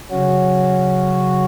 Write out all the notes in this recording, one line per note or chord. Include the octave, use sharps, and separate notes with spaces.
C#3 F#3 C#4 F#4